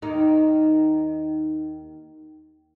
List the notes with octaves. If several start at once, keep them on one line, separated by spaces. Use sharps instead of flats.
D#2 D#3 D#4